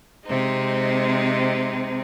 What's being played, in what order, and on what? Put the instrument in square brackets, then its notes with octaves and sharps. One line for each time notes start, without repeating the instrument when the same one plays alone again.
[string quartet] C3 G#3 C4 D#4